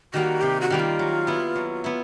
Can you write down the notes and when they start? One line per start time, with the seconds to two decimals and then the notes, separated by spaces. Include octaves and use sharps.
0.14 D#3 G3 A#3 F#4
0.41 C3 G4
0.61 F#4
0.70 D#3 G3 A#3
0.79 F4
0.99 F#3
1.27 B3 E4
1.55 F#3
1.84 B3 E4